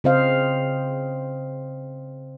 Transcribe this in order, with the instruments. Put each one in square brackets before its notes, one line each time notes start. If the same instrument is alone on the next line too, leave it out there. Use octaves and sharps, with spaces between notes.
[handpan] C#3 C4 C5 D#5 F5